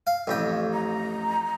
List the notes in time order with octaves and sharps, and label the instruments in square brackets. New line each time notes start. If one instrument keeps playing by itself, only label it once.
[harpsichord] F5
A1 F2 G5
[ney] A#5